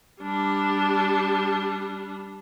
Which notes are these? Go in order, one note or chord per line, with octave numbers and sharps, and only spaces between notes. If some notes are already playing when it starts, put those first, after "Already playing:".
G3 D4